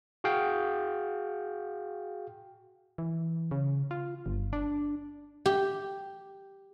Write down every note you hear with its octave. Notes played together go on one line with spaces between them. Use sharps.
F#4 G#4 F5 G5
E3
C#3
F4
G1
D4
G4